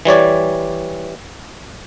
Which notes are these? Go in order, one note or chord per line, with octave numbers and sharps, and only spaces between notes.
E3 G3 C#5 D5